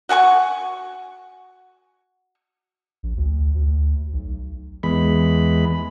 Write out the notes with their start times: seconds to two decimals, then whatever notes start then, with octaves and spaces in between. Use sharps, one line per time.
0.09 F#4 F#5 G#5 C#6
3.03 A#1
3.17 D2
3.55 D2
4.13 B1
4.83 E2 G#3 B5